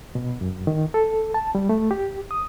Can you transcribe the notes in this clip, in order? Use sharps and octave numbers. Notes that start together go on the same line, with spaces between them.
B2
F#2
D#3
A4
A5
G3
A3
G4
D#6